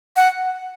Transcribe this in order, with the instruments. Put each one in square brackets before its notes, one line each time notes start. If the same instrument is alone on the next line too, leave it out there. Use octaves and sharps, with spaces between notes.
[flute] F#5